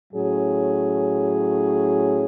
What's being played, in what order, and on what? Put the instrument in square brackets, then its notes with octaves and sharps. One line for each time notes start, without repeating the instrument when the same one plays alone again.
[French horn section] A2 F#3 C#4 G#4